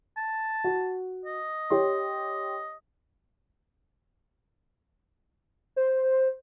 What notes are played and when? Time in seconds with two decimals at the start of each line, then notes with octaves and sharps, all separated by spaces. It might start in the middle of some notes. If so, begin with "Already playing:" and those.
0.17 A5
0.64 F#4
1.26 D#5
1.70 G4 C#5 C6
5.76 C5